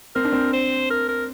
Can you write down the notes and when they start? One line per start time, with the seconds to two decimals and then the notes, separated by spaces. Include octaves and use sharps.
0.15 C4 A#4
0.25 D4
0.33 C4
0.53 C5
0.90 A#4
1.08 A#4